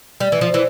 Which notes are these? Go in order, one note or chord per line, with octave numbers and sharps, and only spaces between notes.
G3
E3
F3
E3